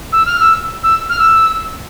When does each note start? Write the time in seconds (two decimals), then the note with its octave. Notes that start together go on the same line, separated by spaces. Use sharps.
0.12 E6
0.25 F6
0.39 E6
0.83 E6
1.09 F6
1.18 E6